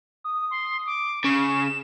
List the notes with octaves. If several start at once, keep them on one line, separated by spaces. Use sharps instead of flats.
D#6
C6
D6
C#3 C#6 E7